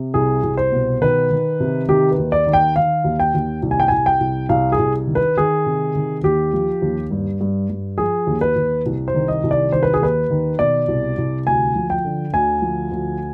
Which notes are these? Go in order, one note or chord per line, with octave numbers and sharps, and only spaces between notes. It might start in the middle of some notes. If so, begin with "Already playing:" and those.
Already playing: C3
C2 G#4
C2
C5
B2
D#3 B4
D#3
C3
D#3 G4
B4
D#2
D5
D#3
G5
D#3 F5
D#2
G5
D#2
C2
G#5
G5
C2 G#5
G5
C2
C2 F5
G#4
C2
D#3
B4
D#3 G#4
C3
D#3
D#2 G4
F3
D#2
G2
G2
G2
F3 G#4
D#2
B4
D#2
C2
C5
D#3
D#5
C2
D5
D#3 C5
B4
G#4
D#2 B4
D#3
B2 D5
C2
C2
D2 G#5
F3
G5
D3
D2 G#5
F3
D2